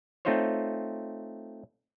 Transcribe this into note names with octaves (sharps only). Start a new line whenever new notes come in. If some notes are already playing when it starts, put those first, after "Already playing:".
A3 C4 D#4 F4 C5 C#5